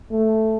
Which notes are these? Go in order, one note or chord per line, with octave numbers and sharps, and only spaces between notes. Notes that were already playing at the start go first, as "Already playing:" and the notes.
A3